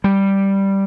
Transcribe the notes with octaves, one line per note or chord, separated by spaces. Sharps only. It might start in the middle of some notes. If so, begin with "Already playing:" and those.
G3